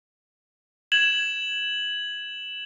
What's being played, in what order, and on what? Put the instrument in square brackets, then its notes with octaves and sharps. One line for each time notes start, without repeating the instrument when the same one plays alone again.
[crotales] G#6 E7 F#7